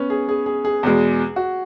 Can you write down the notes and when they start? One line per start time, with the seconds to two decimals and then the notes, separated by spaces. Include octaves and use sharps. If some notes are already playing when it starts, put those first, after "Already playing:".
Already playing: B3 C#4
0.10 G#4
0.29 G#4
0.46 G#4
0.65 G#4
0.83 E2 B2 G#3
1.36 F#4